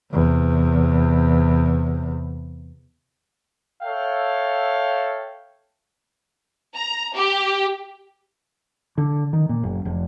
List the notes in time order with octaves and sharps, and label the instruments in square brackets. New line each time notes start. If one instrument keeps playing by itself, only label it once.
[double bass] E2 C3
[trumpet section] A4 C#5 E5 F5 G5
[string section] A#5
G4
[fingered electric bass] D3
D#3
A#2
F#1
F1